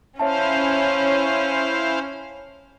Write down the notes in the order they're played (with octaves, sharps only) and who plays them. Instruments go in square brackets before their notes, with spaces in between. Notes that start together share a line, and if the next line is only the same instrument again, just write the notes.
[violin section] C#4 [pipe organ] E4 C5 F5 [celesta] C#5 E5 A5